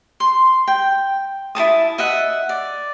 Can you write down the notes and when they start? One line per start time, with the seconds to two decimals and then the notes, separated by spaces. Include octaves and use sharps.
0.20 C6
0.68 G5
1.55 E4 A4 A5 D#6
1.98 D#5 E5 F#5
2.49 D5